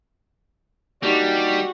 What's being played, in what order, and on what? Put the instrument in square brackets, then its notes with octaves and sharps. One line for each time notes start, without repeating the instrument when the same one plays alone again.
[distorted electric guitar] G3 [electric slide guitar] A#3 D4 D#4 [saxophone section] F#4 G4 [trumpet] D5